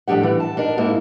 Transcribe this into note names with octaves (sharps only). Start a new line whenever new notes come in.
A2 F3 D4 G4 F#5
E3
A5
D4 D#4 A#4
G#2 A#3 E4